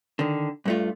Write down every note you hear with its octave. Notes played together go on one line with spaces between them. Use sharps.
D3 D#3
G2 A3 F4